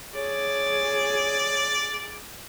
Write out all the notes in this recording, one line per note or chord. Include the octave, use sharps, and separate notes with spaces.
G#4 C#5 D5